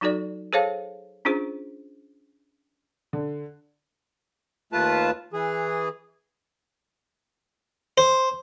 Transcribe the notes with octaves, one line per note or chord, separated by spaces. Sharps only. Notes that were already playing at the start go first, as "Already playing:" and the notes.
F#3 D#4 F#4 A4 D5
G#4 A4 C5 C#5 F5 A5
C#4 D4 F4 G#4 C5
D3
D#2 A3 F4 B4 A5
E3 G#4
C5